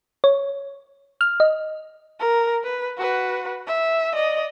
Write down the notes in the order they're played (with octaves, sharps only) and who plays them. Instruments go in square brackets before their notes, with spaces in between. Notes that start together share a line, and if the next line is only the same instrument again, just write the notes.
[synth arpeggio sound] C#5
F6
D#5
[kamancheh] A#4
B4
F#4 B4
E5
D5 D#5